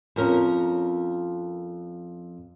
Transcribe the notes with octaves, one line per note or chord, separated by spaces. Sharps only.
F2 C#4 A#4